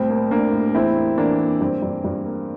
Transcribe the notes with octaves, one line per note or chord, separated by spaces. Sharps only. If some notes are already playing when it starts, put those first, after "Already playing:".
Already playing: C2 A2 C4
A#3
A2 A#3 D4
A2
E2 C4 E4
A#3
E3 A#3 D4
A#3
G2 C4
G2
G2
A#3